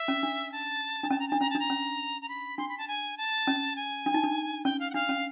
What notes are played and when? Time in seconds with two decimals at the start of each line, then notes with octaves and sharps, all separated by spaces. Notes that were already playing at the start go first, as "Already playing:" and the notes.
Already playing: E5
0.08 C#4
0.23 D4
0.52 A5
1.03 D4
1.10 C#4 A5
1.20 A#5
1.28 D4 A5
1.40 C#4 A#5
1.50 D4 A5
1.60 A#5
1.70 C#4
2.21 A#5
2.29 B5
2.58 D4 C6
2.69 B5
2.78 A5
2.88 G#5
3.18 A5
3.47 C#4
3.76 G#5
4.06 D4
4.14 D#4
4.23 D4
4.65 C#4 G5
4.80 F5
4.91 F#5
4.94 D4 F5
5.09 C#4